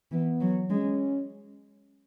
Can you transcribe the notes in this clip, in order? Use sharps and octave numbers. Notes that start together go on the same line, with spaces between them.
E3 B3
F#3
G#3 C#4